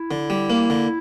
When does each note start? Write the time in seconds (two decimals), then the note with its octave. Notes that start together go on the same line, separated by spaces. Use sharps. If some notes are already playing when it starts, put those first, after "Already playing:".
Already playing: E4
0.11 D3
0.30 G3
0.50 A#3
0.70 D3